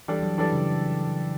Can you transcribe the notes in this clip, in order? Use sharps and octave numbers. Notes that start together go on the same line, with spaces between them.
E3 G3 D4 A4 D5
F#3
E3 G3 D4 A4 D5
C#3